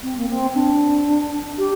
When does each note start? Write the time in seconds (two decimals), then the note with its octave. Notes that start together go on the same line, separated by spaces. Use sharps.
0.03 C4
0.17 A#3
0.29 C4
0.55 D4
1.58 G4